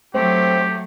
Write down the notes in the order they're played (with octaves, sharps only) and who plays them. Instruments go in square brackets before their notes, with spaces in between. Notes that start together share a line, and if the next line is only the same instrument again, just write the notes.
[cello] F#3 A3 [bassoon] C4 [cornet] G4